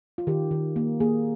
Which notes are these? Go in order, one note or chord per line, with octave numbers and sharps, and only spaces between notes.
F4
D#3 G4
D#3
A#3
A#3 G#4